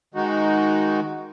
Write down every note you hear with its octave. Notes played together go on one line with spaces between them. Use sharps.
D#3 G#3 D#4 F#4